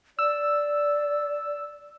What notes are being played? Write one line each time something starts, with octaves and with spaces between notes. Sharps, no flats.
D5 E6